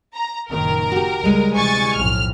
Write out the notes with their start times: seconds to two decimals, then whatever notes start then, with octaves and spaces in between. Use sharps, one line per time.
0.14 A#5
0.50 F#1 A#2 D#3 A#4
0.92 F#4 G4
1.23 C#2 G3 G#3
1.55 D2 C3 E3 G#5 C#6 A6
1.95 B1 F2 A2 F6